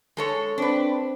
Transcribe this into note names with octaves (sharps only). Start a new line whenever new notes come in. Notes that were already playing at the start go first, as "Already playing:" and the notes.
G#3 A4 C#5
C4 D4 B4